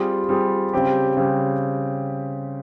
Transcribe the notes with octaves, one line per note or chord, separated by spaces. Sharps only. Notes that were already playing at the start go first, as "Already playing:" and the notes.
Already playing: G3 C4 F4 G#4
G3 C4 F4 G#4
C#3 G3 C4 G4
C#3 G3 C4 G4